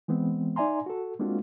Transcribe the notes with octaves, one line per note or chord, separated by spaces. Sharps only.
E3 G#3 B3 C4
D#4 D5 E5 G#5 A#5 C6
F#4 A4
G#3 A#3 C4 D4 F4 F#4